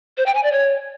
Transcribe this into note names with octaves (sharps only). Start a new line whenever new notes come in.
C5
G5
G#5
D5
C#5